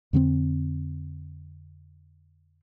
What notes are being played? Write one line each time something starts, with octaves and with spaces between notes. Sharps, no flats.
F2 D3 B3 C4